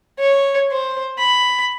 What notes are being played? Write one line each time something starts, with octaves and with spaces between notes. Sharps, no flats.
C#5
C5
B5